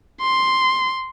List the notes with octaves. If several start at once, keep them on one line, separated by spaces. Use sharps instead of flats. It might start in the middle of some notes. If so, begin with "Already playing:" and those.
C6